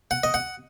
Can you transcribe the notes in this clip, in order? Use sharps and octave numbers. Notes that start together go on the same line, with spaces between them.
F#5
D#5
F#5